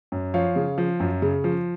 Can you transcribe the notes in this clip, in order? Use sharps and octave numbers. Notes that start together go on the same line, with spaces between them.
F#2
F3 C#5 F5
C#3
F3
F#2
C#3
F3